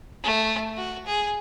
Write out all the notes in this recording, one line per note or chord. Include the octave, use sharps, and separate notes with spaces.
A3
F#4
G#4